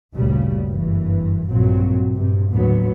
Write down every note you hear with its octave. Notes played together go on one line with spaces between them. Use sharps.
G1 D2 A#2 C#3 G3
F#1 G2 E3
A#1 G2 A#2 F#3 C4
G2 C3
G1 D#2 A2 D3 F#3 B3